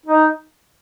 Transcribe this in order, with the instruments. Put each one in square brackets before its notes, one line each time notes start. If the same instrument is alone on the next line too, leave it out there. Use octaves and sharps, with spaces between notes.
[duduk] D#4